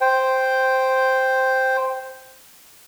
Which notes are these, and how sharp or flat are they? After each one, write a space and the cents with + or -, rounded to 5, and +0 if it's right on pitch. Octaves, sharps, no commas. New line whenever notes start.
C5 +0 G5 +0